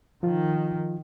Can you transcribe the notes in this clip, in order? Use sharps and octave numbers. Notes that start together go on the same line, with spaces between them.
D#3 F3 F4